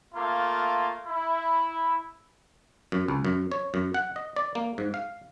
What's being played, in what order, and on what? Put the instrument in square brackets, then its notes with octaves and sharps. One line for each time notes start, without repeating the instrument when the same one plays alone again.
[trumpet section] A3 A#3 F4
E4
[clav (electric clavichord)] F#2
C#2
F#2
C#5
F#2
F#5
D#5
D5
A#3
G#2
F5